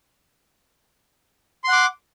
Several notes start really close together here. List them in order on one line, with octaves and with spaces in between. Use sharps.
C6 F#5 D6